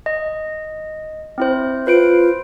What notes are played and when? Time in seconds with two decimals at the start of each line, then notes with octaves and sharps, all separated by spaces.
0.06 D#5
1.38 C4 E4 C5
1.87 F4 B4 C5 D7